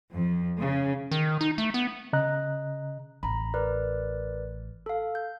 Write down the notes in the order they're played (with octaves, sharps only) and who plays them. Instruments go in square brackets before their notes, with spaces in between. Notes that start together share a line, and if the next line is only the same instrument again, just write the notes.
[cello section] F2
C#3
[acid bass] D#3
D#4
A3
B3
[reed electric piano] C#3 D#5 A#5 F#6
[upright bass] A1 [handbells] A#5 B5
[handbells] A#4 B4 D5
A4 F5
G6